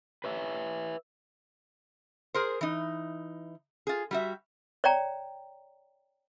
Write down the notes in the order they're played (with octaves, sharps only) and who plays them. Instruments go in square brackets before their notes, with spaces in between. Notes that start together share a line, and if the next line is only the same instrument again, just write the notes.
[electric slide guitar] B4 C#5 E5
[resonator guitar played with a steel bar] G#4 A#4 C5
E3 D#4
F4 G#4
G3 F#4 E5
[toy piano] C#5 D5 G5 A#5